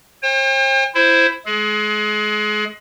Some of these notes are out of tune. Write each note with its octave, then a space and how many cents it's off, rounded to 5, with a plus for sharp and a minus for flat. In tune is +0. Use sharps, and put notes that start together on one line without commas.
C5 +45 G5 +40
E4 +15 C5 +0
G#3 +25 G#4 +35